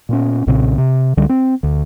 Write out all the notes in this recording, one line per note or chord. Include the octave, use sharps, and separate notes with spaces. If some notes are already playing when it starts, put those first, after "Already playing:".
A#2 B3 C#4
B1 A#2 C#3 C4
C3
C#2 D3 G3
C4
D2